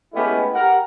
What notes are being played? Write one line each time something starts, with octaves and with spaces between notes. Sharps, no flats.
G#3 A3 B3 C#4 E4 G4
G4 A#4 F#5